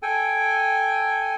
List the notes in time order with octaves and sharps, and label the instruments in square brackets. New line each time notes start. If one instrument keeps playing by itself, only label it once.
[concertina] A4 G5 G#5